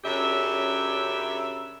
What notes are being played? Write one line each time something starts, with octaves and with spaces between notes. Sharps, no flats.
F#2 C#3 D4 G4 E5